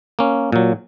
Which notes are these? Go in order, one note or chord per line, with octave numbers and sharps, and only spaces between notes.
A#3 C#4
A#2 F#3